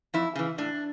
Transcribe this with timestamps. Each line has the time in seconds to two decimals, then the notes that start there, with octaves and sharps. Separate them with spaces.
0.14 F2 E4
0.36 C#3 E3
0.58 A2 D4